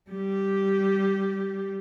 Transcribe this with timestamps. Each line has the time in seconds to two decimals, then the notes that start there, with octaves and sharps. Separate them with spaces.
0.10 G3 G4